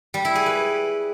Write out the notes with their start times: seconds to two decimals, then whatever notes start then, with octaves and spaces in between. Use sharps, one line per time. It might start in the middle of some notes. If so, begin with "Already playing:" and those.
0.14 G3
0.25 E4
0.35 G#4
0.46 B4